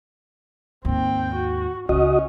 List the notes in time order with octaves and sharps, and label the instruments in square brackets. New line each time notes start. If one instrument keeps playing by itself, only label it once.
[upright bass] D#2 G#2 [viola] C4 G5
[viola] F#4
[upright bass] C#2 D#4 [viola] C#4 [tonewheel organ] F#4 D#5